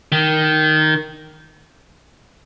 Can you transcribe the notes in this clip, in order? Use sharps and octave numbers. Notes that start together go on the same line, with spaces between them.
D#3